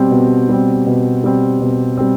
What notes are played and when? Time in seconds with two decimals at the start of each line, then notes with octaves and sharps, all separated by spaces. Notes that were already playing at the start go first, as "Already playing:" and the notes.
Already playing: B2 G3 C4
0.11 B2
0.49 G3 C4
0.87 B2
1.24 G3 C4
1.61 B2
1.97 G3 C4